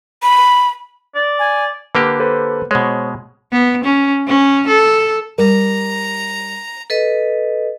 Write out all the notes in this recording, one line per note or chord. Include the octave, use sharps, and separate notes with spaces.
B5
D5
G#5
D3 A#3 G4 B4
A4 B4 C5
B2 G#3 C5 C#5
B3
C#4
C#4
A4
G3 A#4 A#5
A4 B4 D#5